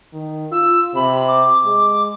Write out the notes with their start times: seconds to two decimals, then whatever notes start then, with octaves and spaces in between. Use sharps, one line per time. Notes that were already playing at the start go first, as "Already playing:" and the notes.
0.13 D#3
0.51 F4 E6
0.95 C3 B5
1.27 D6
1.65 G#3